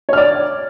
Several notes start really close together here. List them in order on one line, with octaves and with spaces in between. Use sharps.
C#5 F6 D5